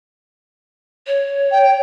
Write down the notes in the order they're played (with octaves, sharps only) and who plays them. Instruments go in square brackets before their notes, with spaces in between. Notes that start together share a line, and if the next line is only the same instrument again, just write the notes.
[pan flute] C#5
[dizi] G5